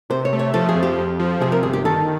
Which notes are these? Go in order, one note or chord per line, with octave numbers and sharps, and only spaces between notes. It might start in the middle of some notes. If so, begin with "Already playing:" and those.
C3 C5
C#5
A3
C#5
F3 A4
G#4
F2
G4
F2
F3
C3 G#4
A#4
G1 G#4
G4
D#3 A4